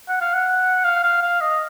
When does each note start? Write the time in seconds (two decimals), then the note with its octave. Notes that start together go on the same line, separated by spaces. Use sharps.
0.08 F#5
0.21 F5
0.33 F#5
0.84 F5
1.03 F5
1.22 F5
1.41 D#5